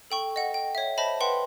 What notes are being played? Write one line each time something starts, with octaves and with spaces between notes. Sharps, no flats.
A4 G5 C#6
D#5 F#5
G5
C#5 E5
C5 D#5 E5 A5 B5
B4 F#5 G5 C6